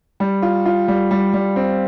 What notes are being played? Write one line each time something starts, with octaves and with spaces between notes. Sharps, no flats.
G3
F4
F4
G3
G3
G3
C4